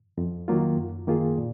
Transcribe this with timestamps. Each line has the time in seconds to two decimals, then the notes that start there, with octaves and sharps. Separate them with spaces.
0.18 F2
0.48 D#3 F#3 A#3 F4
0.77 F#2
1.07 D#3 A#3 F4 G#4
1.38 A#2